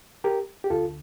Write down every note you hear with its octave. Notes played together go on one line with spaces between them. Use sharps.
G4 A#4
G4
D2 D3 F4 A4